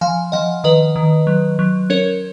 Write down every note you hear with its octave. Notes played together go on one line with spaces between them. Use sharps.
F3 F5 G#5
F3 D#5 F#5
D#3 B4 D#5
D#3
F#3
F#3
C#4 A#4 C#5